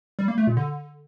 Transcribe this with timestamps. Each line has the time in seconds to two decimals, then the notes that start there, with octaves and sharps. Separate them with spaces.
0.19 G3
0.28 A#3
0.38 A3
0.47 A#2
0.57 D3